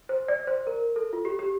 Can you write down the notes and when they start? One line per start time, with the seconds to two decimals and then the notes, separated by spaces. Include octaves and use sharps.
0.09 C5
0.28 D5
0.47 C5
0.67 A#4
0.96 A4
1.13 F4
1.25 G4
1.39 G4